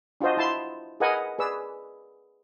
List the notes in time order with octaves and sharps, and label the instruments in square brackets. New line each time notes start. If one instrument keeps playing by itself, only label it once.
[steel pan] D4 F4 F#4 C5 D#5
E4 A5 C6
G#4 A#4 B4 D#5 F#5 G#5
G#4 B4 D5 E6